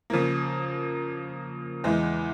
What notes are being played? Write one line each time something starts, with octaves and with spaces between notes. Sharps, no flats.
C#3 F3 A#3
E2 E3 G#3